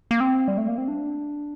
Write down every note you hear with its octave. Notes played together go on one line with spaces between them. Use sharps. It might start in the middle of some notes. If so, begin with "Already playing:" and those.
A#3
C4
G3
A3
A#3
C4
D4